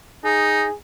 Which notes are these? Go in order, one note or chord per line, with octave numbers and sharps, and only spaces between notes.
D#4 G#4